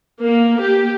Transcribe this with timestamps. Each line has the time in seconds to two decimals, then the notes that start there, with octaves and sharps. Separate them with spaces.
0.22 A#3
0.61 G4